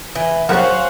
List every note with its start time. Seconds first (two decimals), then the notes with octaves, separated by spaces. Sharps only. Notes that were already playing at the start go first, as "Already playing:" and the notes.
0.15 E3
0.49 D#3 F#3 G3 C#4 F#4 C5 F5 F#5